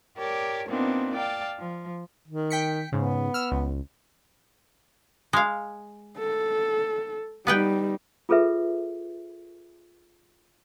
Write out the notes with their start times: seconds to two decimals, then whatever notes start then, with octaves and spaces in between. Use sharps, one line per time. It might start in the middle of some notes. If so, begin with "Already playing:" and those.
0.17 G4 A#4 C#5 D5 A5
0.69 A#2 B3 C4 D4 D#4
1.15 D5 F5 G5 A5
1.59 F3
2.28 D#3
2.50 G5 B6 C#7
2.92 G#2 C#3 B3
3.34 E6 F6
3.52 C#2
5.33 G#3 F5
6.18 A4
7.47 G3 B3 D#4 B4 G5
8.29 F4 G#4 A4 B4 E5